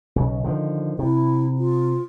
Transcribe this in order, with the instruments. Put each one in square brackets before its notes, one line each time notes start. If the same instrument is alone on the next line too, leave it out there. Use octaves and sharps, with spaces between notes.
[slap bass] B1 C#3
D3 D#3 F3
[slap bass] C3 [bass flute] E4
[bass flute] F4